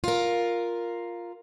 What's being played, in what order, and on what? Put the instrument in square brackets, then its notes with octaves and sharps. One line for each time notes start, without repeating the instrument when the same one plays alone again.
[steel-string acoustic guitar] F4 A#4